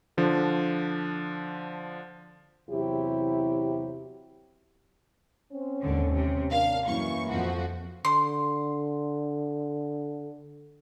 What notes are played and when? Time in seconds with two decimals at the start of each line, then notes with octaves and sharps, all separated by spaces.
0.17 D3 F3 D4
2.69 E2 C3 F#3 E4 G4
5.52 C4 C#4
5.82 D#2 G#2 D3
6.15 C3
6.52 D4 A#4 F5
6.87 F#2 E3 A#3 C#6
7.31 F2 F3 F#4
8.05 D3 C6